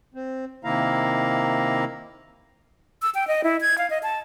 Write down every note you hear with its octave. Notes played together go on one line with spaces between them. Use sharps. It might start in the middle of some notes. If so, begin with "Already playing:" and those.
C4
C3 D#3 A#3 E4 F5 A#5
E6
G5
D#5
E4
G#6
F5
D#5
A5